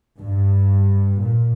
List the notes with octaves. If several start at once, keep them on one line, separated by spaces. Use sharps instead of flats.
G2
A#2